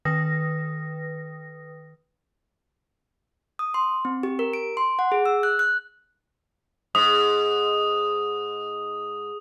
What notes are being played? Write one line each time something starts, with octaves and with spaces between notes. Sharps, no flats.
D#3 B4 G5 D#6 A#6
D#6
C6
C4
G4
A#4
D7
C6
F#5
G#4
E6
F#6
F#6
G#2 D#6